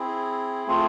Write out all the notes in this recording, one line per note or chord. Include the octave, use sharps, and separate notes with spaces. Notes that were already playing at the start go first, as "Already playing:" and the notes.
Already playing: C4 E4 G#4
A3 C4 F4 G#4